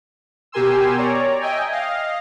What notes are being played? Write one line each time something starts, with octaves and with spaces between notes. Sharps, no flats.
B2 G4 A#4 G#5 C6 E6
C#5 D5 A#5
D#5 E5 G5 G#5
D#5 F5